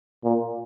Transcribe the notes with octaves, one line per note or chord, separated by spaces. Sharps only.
A#2